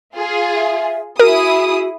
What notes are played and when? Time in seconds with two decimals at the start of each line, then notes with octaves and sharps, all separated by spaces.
0.15 F4 G#4
0.56 E5
1.20 E4 F#4 G#4 A#4 D#6